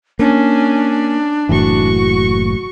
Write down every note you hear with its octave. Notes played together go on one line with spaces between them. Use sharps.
A#3 C#4 D4
F#1 A2 E3 F#4 C#6